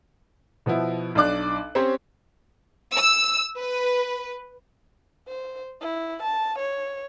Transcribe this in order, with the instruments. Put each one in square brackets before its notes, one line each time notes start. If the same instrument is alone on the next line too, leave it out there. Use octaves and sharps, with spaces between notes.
[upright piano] B2 F3 B3 E4
B1 D4 D5 D6 F#6
C4 C#4 G4 C5 C#5
[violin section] E6
B4
[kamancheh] C5
E4
A5
C#5